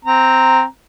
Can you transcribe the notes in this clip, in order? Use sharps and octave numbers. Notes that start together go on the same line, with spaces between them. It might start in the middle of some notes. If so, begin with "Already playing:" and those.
C4 A#5